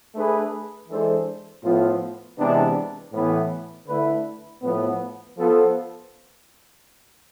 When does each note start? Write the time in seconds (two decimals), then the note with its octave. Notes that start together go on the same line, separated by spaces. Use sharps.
0.14 A3 D4 G#4 B4
0.89 E3 G#3 D4 A4 C5
1.64 A2 F3 B3 F4
2.38 C3 E3 G#3 B3 D4
3.12 A2 E3 B3
3.87 D3 A3 E4 B4
4.62 A2 F3 B3
5.36 F3 B3 F4 A4 C5